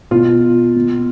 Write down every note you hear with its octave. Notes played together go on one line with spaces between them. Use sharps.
B2 F4
B2